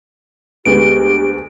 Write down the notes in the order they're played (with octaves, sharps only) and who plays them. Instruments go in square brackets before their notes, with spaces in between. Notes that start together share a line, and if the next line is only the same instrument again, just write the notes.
[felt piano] D2 G#3 B3 [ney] G4 [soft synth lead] D7